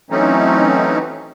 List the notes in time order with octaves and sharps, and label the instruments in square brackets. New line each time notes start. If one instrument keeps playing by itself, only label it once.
[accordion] E3 F#3 A3 C4 C#4 D#4